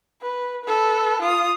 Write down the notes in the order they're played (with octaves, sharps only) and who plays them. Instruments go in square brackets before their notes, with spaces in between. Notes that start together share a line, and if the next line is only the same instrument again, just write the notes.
[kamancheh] B4
A4 B4
F4 D#6